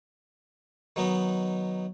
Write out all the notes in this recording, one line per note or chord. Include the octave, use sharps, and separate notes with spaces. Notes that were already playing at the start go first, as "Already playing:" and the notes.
D#3 F#3 B3 D#4